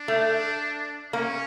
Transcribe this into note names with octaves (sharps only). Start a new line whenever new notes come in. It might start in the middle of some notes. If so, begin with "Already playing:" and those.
Already playing: D4
A3
A#3 C#4